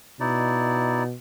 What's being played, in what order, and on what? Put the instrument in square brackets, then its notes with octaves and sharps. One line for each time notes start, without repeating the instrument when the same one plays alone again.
[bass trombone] B2 [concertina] D#4 E4 D5